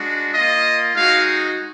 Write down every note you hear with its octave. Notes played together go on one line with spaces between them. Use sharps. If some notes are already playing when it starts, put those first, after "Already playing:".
Already playing: G#3 D4 F#4
A#3 F4 D#5
G#3 D#4 F#4 F5